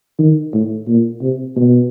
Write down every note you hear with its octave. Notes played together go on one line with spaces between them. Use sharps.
D#3
A2
A#2
C3
B2